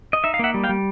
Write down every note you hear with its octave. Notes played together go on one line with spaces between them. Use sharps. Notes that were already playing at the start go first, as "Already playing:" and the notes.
D#5
D#4 E5
F5
A#3 E5 F#5
G3
F5 G5
G3